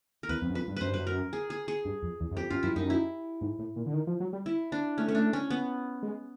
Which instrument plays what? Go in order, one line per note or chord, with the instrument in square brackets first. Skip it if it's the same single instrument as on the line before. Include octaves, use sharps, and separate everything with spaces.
[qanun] A#4
[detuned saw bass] E2 [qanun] B4
[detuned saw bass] F2
F#2
[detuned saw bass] F2 [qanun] B4
[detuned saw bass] G2
[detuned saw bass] F#2 [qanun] B4 C5
[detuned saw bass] G2
[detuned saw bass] F#2 [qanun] B4
[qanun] A#4
G#4
G#4
G#4
[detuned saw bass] G2
F2
E2
F#2
[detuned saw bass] F2 [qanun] G4
[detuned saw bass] F#2 [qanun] F4
[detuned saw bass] F#2 [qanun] E4
[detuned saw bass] F#2 [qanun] D#4
[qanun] E4
[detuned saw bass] G#2
A2
A#2
D3
D#3
F3
F#3
G3
[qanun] E4
D4
[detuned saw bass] A3 [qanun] C#4
[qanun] C#4
D4
C#4
B3
[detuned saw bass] G#3